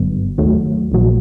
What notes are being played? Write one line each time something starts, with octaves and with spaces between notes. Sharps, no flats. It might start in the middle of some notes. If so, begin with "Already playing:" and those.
Already playing: G1 G2 D3 F#3 B3
D#2 D#3 F#3 A3
A#1 A#2 F#3